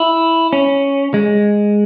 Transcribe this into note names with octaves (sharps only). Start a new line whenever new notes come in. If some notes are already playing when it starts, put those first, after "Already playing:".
Already playing: E4
C#4
G#3